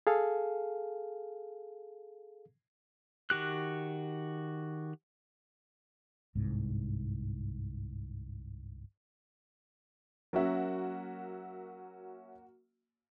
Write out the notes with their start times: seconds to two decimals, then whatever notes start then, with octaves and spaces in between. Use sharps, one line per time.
0.07 G#4 A4 F5
3.30 D#3 F#4 G4 F#6
6.35 G1 C2 G#2
10.33 F#3 A#3 C#4 F#4 E5